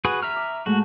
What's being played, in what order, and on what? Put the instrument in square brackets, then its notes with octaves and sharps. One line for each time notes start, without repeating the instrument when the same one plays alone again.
[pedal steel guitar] F#4 G#4 B4
E5 A#5 F6
[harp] D6
[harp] G#2 G#3 A3 [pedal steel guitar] F#4